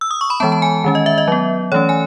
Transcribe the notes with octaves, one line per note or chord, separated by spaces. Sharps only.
E6
D#6
C#6
B5
E3 G#3 B3 A5
A5
G#5
D#3 G#3 C#4
D#5
E5
D#5
F#3 B3
E3 A3 C#4 C#5
G#5